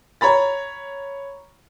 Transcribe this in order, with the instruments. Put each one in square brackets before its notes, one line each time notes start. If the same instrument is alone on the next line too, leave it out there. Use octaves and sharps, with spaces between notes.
[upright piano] C#5 A#5 B5 A6